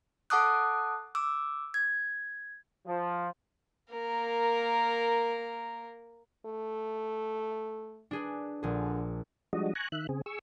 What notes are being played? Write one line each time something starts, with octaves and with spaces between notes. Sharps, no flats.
A4 F#5 A5 D6 D#6 F#6
D6 E6
G#6
F3
A#3 A#4
A3
D4 G#4 B4
A#1 D3 G#4
F3 G3 G#3 D4 F#4 D#5
G#5 A#5 C#6 F#6
D#3 E5 F#6
C#3 C4 G#4
G#4 C#6 E6